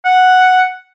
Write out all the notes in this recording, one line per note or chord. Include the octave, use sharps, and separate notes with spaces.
F#5